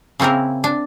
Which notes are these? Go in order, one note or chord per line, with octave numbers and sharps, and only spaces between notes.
C#3 A#3 C4 E4 A#4
D4